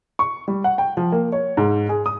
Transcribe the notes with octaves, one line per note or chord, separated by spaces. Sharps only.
C#6
G3
F#5
G5
F3
A#3
C#5
G#2
G#4
D#6